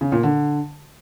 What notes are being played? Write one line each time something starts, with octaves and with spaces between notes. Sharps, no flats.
C#3
A#2
D3